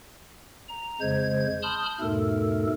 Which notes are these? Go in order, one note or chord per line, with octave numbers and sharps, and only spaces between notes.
A#5
F2 C#3 G#3 C5 G#6
A5 B5 C6 D#6 F6 G6
E2 G#2 B2 A3 A4 A#4